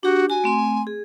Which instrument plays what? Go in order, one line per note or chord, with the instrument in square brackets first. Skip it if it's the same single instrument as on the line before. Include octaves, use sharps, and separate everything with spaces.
[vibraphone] D4 G4 [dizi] F#4
[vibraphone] F#4 [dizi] G#5
[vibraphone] A3 C4 C6
G#4